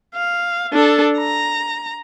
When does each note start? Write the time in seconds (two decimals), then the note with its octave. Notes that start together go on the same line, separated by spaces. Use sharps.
0.15 F5
0.73 D4 A4
1.17 A#5